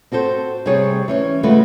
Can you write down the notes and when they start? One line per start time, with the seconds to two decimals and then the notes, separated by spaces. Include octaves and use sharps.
0.12 C4 F#4 A4 C5
0.66 C3 G3 C4 G#4 C#5
1.08 E3 C#4 C#5
1.43 C#3 G#3 A3 B3 F4 B4